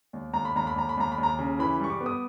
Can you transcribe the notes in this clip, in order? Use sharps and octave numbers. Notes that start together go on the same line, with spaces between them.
D#2
D#2 A#5
B5
D#2 A#5
B5
D#2 A#5
B5
D#2 A#5
B5
D#2
A#5
C#3
E3 B5
G3 C#6
D6
B3
D#6